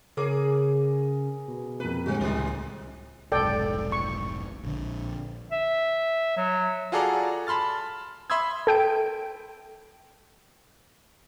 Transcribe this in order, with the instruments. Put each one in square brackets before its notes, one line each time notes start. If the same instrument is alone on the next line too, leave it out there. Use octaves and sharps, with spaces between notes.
[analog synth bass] C#3 [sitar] G#4 [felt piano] A#4 C#5 D6
[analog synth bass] B2
[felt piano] F2 A#3 [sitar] B4
[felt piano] A2 G3 G#3 [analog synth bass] D3 [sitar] C4 F#4
[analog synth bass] C#2 [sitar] B2 D#3
[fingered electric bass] F1 B1 G#2 [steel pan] A4 D5 G5
[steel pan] C#6
[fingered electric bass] A#1 D3
[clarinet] E5
F#3
[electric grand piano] F4 F#4 G#4 A4 D5 A#5
A5 B5 C6 F6 A6
E5 B5 C6 D#6 E6 G#6
[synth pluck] A4 G5 D7